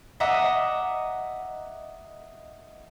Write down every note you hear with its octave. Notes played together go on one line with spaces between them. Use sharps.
D#5 E5 F#5 A#5 D6 D#6